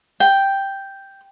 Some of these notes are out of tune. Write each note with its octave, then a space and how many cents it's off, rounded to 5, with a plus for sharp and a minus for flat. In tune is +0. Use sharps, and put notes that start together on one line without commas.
G5 +0